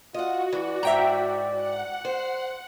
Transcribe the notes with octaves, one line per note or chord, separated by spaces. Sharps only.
F4 F#4 D#5 F#5
E3 D5
G#2 E5 G5 A#5
F#5
C5